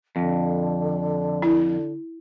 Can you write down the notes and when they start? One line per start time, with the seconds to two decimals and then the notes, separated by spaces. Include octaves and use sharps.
0.16 F2 D3
1.42 E4